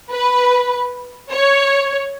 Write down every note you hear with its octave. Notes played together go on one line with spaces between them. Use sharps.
B4
C#5